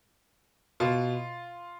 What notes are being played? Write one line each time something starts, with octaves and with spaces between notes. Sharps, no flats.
B2 F4